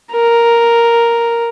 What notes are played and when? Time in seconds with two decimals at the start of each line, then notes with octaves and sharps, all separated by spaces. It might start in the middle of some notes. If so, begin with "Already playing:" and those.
0.12 A#4